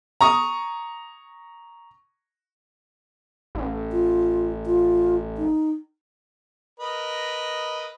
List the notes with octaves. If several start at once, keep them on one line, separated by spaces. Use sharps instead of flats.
A#5 C#6 D#6
A1
F4
F4
D#4
A#4 B4 D#5